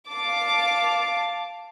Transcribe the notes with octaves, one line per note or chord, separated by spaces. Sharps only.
F5 A5 D6